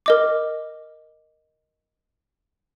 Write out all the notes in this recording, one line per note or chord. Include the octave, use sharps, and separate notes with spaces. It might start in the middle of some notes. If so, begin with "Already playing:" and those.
A#4 D#5 D6